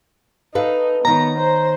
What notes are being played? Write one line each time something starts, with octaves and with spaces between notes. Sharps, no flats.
D#4 A4 B4 F5
D#3 B3 C#5 A#5
C5